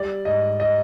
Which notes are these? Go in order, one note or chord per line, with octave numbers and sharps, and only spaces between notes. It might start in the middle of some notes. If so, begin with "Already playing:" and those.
Already playing: G3 D5
G#2 D#5
D#5